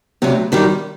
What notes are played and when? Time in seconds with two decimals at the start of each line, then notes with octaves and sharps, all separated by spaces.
0.22 D2 C3 F#3
0.52 F#2 D#3 G3